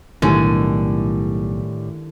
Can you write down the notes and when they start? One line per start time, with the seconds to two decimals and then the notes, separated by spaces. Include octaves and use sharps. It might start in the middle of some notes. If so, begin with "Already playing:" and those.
0.22 B1 A2 D3 D#3 G3 E4 G4 G#5